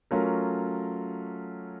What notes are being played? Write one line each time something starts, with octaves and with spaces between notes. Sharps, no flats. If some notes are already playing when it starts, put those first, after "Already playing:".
F#3 A3 C#4 F4 A#4